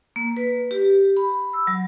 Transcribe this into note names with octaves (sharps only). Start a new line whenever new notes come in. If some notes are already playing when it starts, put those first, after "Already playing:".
A#3
B4
G4
B5
E6
F#3